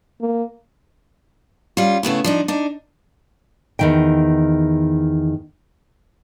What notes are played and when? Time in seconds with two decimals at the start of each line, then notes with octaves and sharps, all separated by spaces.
0.21 A#3
1.77 G3 C#4 F4
2.03 C#3 A3 B3 E4
2.24 F3 D4 D#4
2.48 D4 D#4
3.79 E2 D#3 G5